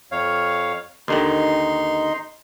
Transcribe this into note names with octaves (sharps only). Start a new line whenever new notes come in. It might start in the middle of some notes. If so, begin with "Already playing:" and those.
F2 C#5 F5
D#2 D3 D#3 D#4 C6